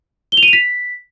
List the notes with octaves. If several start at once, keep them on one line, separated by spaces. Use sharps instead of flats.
G7
F7
D#7
F7
B6